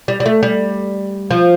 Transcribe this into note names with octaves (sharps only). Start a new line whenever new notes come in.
G3
G3
A3
G3
F3